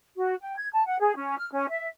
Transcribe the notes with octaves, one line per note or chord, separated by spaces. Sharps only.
F#4
G5
G#6
A5
F#5
G#4
C#4
F6
C#4
E5